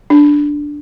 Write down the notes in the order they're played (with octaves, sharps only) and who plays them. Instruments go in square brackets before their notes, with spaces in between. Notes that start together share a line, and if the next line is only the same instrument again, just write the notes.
[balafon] D4